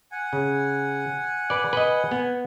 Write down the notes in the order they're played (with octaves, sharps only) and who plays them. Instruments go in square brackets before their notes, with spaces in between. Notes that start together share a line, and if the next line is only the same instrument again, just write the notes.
[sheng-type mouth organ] F#5 G#5
[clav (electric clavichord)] C#3
B4 D5
B4 D#5
B3